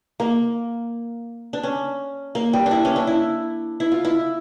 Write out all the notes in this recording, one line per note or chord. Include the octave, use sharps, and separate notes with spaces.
A#3
D4
C#4
A#3
G3
D4
E4
C#4
D4
E4
E4
F4
E4